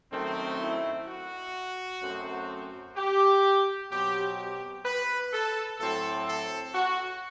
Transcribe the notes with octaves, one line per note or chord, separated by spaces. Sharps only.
F#2 D#3 A3 C4
E4
F#4
F#2 F#3 A3 C4
G4
B2 F#3 C4 G4
G4
B4
A4
A2 F#3 C4 A4
A4
F#4